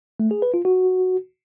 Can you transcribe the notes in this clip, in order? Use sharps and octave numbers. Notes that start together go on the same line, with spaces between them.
A3
G#4
B4
F4
F#4